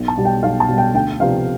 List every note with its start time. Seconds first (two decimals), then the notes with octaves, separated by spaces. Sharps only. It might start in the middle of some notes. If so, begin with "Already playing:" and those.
Already playing: B1
0.08 A5
0.17 B2 G3
0.25 G5
0.43 B1 F5
0.60 A5
0.68 B2 G3
0.78 G5
0.94 D2 G5
1.20 C3 F3 B3 D4 F5